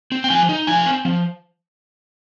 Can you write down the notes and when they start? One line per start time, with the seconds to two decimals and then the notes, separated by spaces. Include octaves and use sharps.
0.12 C4
0.24 G5
0.30 F3 G#5
0.49 D#4
0.67 F3 G#5
0.86 C4
1.05 F3